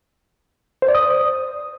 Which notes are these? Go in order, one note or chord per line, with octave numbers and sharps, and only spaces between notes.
C5
D5
D#6